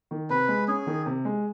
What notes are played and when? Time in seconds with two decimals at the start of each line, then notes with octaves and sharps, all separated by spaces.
0.11 D#3
0.30 C3 B4
0.48 G#3
0.68 C#4 G#4
0.87 D#3
1.06 C3
1.25 G#3